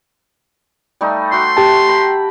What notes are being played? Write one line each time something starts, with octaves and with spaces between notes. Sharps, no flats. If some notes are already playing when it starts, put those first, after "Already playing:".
G3 A3 D#4
F#4 E5 C6
G4 A5
G5 A#5 B5